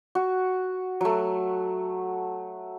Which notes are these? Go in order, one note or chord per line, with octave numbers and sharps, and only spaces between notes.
F#4
F#3 A3